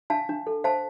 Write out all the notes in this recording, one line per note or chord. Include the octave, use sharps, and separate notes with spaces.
D4 F5 A5
D4
A4
C5 F5 A5